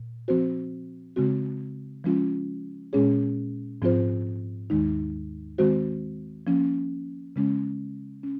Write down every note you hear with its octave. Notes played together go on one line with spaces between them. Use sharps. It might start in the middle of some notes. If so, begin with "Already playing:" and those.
Already playing: A#2
F3 C4 F#4 C5
C#3 G#3 C4 F#4
F3 G#3 C#4 F4
A#2 G#3 C#4 G#4 C#5
G#2 F3 C4 F4 C5
D#2 D#3 G#3 D#4
D#3 G#3 C4 F#4 C5
F3 A#3 C#4
C#3 G#3 C#4
C#4